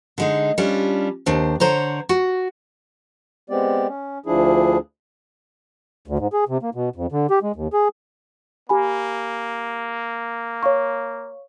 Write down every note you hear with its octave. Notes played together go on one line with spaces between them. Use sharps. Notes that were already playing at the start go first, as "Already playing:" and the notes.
D3 G#3 D#4
G3 C#4 D4 F4
D#2 D4 C5
D3 C5 C#5 A#5
F#4
G#3 B3 C4 G4 D5
C#4
D2 F3 D4 E4 G#4
D2
G#2
G#4
C3
A#3
B2
F2
D3
G4
G#3
D#2
G#4
A#3 G4 G#5 B5
C#5 F5 C#6